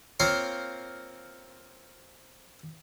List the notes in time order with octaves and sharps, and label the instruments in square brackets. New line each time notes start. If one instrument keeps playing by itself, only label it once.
[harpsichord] A#3 C4 F4 C5 C#5